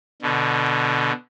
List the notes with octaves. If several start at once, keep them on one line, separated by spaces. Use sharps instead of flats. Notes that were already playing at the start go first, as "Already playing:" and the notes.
B2 D3